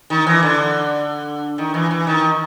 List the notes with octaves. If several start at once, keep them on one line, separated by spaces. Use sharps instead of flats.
D#3
E3
D3
D#3
E3
E3
D#3